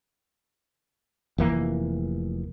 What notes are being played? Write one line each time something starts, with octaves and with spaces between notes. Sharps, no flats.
F1 E3 A#3